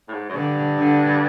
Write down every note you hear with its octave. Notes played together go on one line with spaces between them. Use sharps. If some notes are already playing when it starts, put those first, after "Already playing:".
A2
G#2
F#2
G2 D3
D3